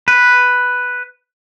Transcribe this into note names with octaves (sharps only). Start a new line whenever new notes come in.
B4